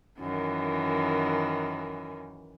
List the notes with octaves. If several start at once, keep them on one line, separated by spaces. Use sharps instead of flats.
F#2 D#3 E3